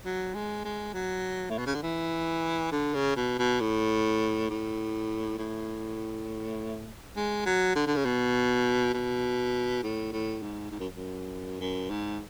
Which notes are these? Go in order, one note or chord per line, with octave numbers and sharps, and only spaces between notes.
F#3
G#3
G#3
F#3
A2
B2
C#3
D3
E3
D3
C#3
B2
B2
A2
A2
A2
G#3
F#3
D3
D3
C#3
B2
B2
A2
A2
G#2
G#2
F#2
F#2
F#2
G#2